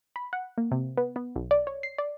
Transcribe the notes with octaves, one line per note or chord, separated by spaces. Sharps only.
B5
F#5
A#3
C3
B3
B3
B1
D5
C#5
C7
D5